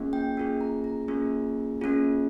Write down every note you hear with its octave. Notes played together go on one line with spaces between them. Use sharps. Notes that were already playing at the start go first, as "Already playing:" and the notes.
Already playing: A#3 C#4 F4 G#4
G5
A#3 C#4 F4 G#4
A#5
A#5
A#3 C#4 F4 G#4
A#3 C#4 F4 G#4